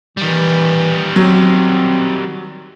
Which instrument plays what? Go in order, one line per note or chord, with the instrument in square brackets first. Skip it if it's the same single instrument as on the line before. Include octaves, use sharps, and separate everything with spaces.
[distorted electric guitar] D#3 G3 [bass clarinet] E3
[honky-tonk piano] F#3 [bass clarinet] C4